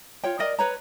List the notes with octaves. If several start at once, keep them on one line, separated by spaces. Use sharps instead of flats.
F4 C#5 G5
A#4 D5 D#5
B4 C#5 A#5